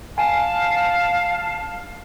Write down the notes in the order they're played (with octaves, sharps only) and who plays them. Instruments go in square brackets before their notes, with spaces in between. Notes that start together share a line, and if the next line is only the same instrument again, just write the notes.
[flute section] F5 A5 [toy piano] G#5